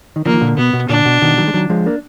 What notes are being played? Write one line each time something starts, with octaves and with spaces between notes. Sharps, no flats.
D#3
D3 F3 A#3
D#3
A#2 D3
B2 B3
B2
A#2 D3 D4
B2
B2 D#3
D#3 F#3
G#3
D#3 F#3
F3 G#3
A#3 D4